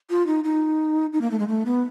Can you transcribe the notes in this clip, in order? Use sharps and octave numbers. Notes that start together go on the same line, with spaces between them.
F4
D#4
D#4
D#4
A#3
A3
G#3
A3
B3